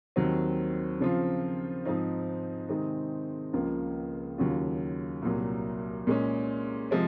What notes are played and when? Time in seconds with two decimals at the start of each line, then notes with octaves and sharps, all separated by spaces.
0.16 D#2 D#3 F#3 C4
1.00 C#3 F3 C4 F4
1.85 G#2 F3 C4 D#4
2.69 C3 D#3 G#3 C4 D#4
3.53 C#2 C#3 F3 A#3 F4
4.38 D#2 C#3 F#3 C#4 F4
5.22 C2 A#2 F#3
6.07 A#2 G#3 C#4
6.91 C3 F3 G#3 C4